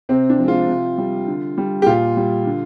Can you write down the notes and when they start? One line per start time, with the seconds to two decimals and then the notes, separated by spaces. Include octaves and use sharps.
0.09 C3 C4
0.30 D4
0.39 F3 G#3
0.48 F4
0.68 C3
0.98 G3
1.28 D3
1.58 G3
1.82 G4
1.86 A#2 F4
2.17 G3
2.47 D3